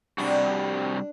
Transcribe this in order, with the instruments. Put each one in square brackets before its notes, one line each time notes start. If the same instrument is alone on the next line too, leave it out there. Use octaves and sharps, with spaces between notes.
[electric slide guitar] C3 G3 F#4 [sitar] D4